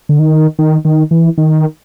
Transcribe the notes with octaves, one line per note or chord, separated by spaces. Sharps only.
D3
D#3
D#3
D#3
E3
D#3